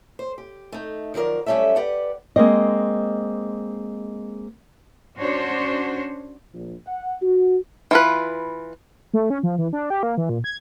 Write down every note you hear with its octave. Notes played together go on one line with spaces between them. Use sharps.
C5
G4
A3 D#4
D#3 F3 F#3 A#4 D5
F#3 G3 A3 C#4 A4 E5
G4 B4 D5 F#5
G#3 A#3 C4 D#5
C#4 D4 F#4 C5 C#5
A#1
F#5
F#4
E3 F4 B4
A3
C#4
F3
E3
D4
G4
A#3
E3
A#2
G#6